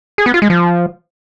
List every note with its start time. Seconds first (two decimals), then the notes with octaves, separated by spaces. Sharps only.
0.18 G#4
0.26 B3
0.34 F4
0.42 G#3
0.50 F3